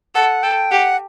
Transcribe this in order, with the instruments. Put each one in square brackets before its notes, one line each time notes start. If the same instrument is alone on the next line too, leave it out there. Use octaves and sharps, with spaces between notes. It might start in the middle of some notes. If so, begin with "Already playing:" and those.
[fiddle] A4 [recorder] F#5
[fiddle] A4 [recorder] G5
[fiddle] G4 [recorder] F#5